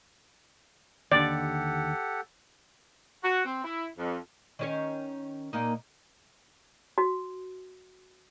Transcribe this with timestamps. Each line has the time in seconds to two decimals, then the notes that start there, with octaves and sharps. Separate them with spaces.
1.12 D#2 D3 G4 A4 D5 F#5
3.24 F#4
3.45 C4
3.64 E4
3.98 F2
4.59 D#3 C#4 C#5
5.53 A#2 A#3 D#4
6.98 F#4